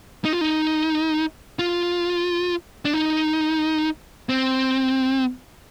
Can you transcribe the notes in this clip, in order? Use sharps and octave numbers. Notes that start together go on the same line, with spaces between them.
D#4
F4
D#4
F4
D4
D#4
C4